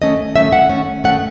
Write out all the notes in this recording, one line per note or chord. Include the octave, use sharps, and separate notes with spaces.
D#3 A3 C#4 D#5
D#3 A3 C#4 E5
F#5
D#3 A3 C#4
D#3 A3 C#4 F#5